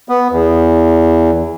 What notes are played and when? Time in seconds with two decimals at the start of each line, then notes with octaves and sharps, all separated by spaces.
0.09 B3
0.31 E2